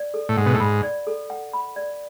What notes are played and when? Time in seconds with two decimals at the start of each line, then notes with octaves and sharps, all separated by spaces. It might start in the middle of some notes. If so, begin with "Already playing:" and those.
Already playing: D5
0.14 A4
0.29 A2
0.37 G#2 F#5
0.46 B2
0.53 A2
0.60 G#2 B5
0.83 D5
1.07 A4
1.30 F#5
1.53 B5
1.76 D5